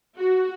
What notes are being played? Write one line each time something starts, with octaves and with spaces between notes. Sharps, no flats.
F#4